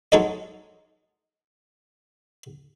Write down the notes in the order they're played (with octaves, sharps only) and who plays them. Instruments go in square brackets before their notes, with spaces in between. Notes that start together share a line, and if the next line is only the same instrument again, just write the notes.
[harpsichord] F#3 G#3 D#4 A4 C#5 D#5